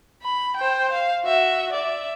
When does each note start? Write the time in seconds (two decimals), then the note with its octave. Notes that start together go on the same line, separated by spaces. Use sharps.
0.23 B5
0.57 C5 G5
0.93 F5
1.24 F#4 E5
1.73 D5 E5